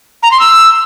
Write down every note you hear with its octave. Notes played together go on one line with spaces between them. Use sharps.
A#5
C6
E6